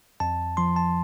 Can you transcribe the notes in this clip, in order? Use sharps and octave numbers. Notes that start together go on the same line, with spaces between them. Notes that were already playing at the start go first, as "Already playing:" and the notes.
F2 A5
F3 C6
A5